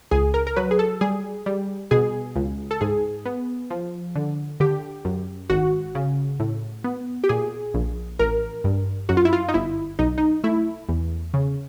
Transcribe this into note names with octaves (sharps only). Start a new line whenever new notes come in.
C#2 G#4
A#4
A#4
F#3 B4
G#4
A4
G3 G#4
G3
B2 G#4
C#2
A4
G#2 G#4
B3
F3
D3
D3 G4
F#2
G#1 F#4
C#3
A2
B3
G4
A#2 G#4
A#1
A1 A#4
G2
F#2 F#4
F4
E4
F4
D#4
G1 E4
B1 D#4
D#4
A3 E4
E2
C#3